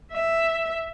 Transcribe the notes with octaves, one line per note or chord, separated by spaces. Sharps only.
E5